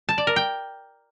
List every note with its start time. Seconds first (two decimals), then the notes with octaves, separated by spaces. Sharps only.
0.09 A5
0.18 D5
0.27 A#4
0.36 G5